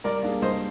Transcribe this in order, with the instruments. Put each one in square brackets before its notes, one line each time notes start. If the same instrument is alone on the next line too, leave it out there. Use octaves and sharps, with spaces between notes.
[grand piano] G3 [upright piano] A#4 D5
[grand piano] A#3 D4 G#4
[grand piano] G3 [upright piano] C5 D#5